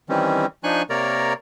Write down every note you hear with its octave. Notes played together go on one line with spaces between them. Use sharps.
D#3 E3 G3 C4 C#4
F3 D4 D#4 G#5 C#6 F#6
C3 A#3 A#4 C#5 D5 A#5